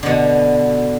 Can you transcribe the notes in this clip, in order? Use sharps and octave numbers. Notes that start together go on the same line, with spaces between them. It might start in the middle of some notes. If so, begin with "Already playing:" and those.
B2 D3